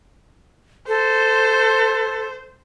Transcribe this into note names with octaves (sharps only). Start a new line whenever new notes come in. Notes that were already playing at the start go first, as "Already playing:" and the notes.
A4 C5